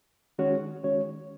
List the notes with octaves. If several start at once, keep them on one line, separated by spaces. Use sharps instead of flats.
D#3 G#3 C#4 F#4 C#5
D#3 G#3 C#4 F#4 C#5